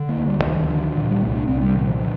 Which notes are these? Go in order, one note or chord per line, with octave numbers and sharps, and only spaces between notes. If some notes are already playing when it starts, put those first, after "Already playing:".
Already playing: D3
A#3
D2
G3
F3
D2 D#3
D#3
D3 F3
D#3
A#2 F3
G3
C2 A3
D4
C2 C4
G3
A#2 D#3
F3
D3